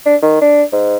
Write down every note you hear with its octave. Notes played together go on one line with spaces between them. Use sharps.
D4
D#3
D4
G#2